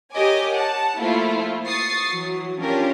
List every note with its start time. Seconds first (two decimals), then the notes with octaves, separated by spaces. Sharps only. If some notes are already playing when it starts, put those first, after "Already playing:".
0.14 G4 A#4 C#5 D#5 G#5 D6
0.55 F#5 A5
0.99 F3 A3 A#3 E4 F4
1.67 C#6 D#6 A6 C7
2.09 E3 F#3
2.62 C#4 D4 F4 G4 A#4